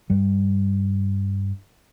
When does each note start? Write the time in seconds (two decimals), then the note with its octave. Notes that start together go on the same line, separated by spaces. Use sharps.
0.10 G2 G3